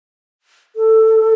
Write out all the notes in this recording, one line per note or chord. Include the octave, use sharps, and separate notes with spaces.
A4